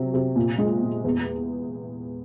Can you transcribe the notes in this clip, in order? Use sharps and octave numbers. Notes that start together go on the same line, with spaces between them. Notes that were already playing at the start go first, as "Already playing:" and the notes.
Already playing: C3 F#3
C3
A#2
G#3
A#2
E2